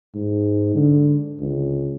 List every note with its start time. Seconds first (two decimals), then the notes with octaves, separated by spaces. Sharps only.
0.15 G#2
0.75 D3
1.40 C#2